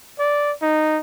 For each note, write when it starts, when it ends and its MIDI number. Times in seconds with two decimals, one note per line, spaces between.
0.19 0.53 74
0.62 1.01 63